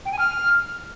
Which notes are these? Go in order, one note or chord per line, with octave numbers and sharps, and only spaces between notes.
G5
G#5
F6